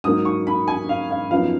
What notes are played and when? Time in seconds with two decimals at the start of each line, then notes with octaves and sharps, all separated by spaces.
0.04 G#2 F#3 A#3 D#4 D#6
0.25 C#6
0.47 B5
0.68 G#5
0.89 F5
1.11 F5
1.31 F#2 F3 B3 D#4 F5